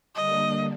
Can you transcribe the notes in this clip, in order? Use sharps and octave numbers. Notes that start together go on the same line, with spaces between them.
D3 G3 A#3 D4 D#5